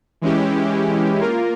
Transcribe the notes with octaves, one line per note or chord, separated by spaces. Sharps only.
E3 G#3 C#4 E4 G4
A#3 F4 A#4